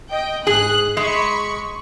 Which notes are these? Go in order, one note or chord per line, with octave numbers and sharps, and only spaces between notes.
D#5 G5
G#2 G#4 F#6
G#3 B5 C#6